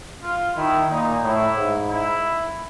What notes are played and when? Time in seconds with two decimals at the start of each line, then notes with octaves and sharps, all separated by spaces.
0.23 F4
0.56 D#3 E4
0.89 A#2 D#4
1.23 A2 E4
1.56 G#2
1.90 E4